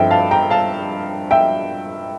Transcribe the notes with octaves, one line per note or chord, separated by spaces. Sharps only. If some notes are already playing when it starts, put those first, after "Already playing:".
Already playing: G2 F3 C4 A4 E5 G5
F5 A5
G5 A#5
F5 A5
E5 G5